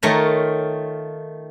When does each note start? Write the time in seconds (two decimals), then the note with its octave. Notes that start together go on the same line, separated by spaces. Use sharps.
0.03 D#3 A3 F4 C#5 A#5